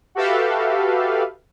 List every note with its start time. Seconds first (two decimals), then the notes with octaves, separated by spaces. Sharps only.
0.15 F#4 G4 A4 B4 E5 F5